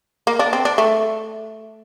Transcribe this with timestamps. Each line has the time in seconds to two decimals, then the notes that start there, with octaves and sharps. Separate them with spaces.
0.27 A#3
0.39 D4
0.53 C4
0.65 D4
0.78 A3